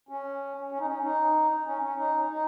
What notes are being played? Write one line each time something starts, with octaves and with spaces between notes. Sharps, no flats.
C#4
C#4
D#4
C#4
D#4
C#4
C#4
D#4
D#4